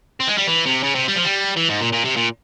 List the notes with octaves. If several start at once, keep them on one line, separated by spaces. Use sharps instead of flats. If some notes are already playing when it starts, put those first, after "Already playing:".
C4
G#3
G3
E3
C3
C#3
C3
G3
F3
G3
E3
G#2
A#2
A#2
C3
A#2